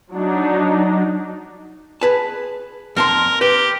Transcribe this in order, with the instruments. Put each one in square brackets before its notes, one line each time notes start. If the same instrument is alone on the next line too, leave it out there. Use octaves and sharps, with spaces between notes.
[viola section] F#3 D4 D#4
[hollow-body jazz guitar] G#4 B4 A5
[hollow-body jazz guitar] F2 A5 C6 [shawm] A#4
[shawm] G4 [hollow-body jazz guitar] B4